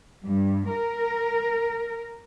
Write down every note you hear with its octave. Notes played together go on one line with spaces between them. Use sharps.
G2
A#4